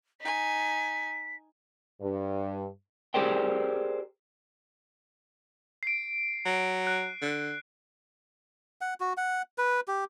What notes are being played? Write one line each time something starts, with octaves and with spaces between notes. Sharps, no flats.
D#4 G#5 B6
G2
G4 G#4 A#4 C5 D5 G5
C7 D7
F#3
F#6
D3
F#5
F#4
F#5
B4
G4